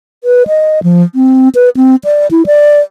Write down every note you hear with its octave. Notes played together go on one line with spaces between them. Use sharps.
B4
D#5
F3
C4
B4
C4
D5
E4
D5